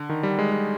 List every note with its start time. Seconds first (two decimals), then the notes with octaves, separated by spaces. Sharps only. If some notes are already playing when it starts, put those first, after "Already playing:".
Already playing: D3
0.09 D#3
0.23 G3
0.39 G#3
0.52 G3